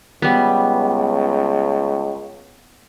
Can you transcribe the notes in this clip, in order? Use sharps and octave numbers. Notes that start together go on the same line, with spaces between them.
C#2 G3 B3